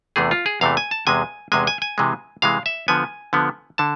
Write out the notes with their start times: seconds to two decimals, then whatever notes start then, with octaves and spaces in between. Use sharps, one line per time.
0.16 E2 C3 E3 A3 G#4
0.31 F4
0.46 G#4
0.61 E2 C3 E3 A3 F5
0.77 G#5
0.91 A5
1.07 E2 C3 G#3 G#5
1.52 E2 C3 G#3 G#5
1.67 G#5
1.82 G#5
1.98 C3 E3 G#3
2.42 C3 E3 G#3 F5
2.66 E5
2.88 D3 F3 B3 G#5
3.33 D3 F3 B3
3.78 D3 A5